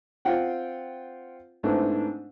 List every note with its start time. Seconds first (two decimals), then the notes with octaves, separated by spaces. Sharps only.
0.25 C4 F4 F#5 G5
1.63 G#2 A3 B3 C4 D4 E4